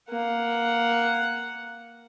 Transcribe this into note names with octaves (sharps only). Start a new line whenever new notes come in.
A#3 F#5